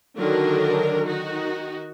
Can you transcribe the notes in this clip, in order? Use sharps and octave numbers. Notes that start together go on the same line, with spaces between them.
D3 D#3 F#3 D4 A#4
D#3 D#4 F#4